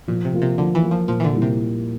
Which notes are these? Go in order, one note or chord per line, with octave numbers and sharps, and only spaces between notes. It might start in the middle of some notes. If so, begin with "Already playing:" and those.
A#2 F3
C3
A#3 F4
C3
D3 F3
E3
A#3 F4
F3
A#2 F3
E3
D3
G3 A#3 E4
C3